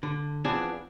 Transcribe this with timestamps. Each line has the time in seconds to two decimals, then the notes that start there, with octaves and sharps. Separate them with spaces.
0.03 D3
0.44 E3 F3 B3 C4 D4 G#4